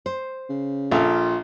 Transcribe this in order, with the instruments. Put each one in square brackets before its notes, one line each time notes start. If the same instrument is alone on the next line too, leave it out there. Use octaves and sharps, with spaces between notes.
[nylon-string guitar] C5
[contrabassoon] C#3
[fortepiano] A#1 A4 [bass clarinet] F4 [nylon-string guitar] E5 F5